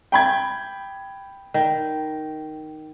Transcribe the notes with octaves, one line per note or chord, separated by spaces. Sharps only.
G5 B5 G#6
D#3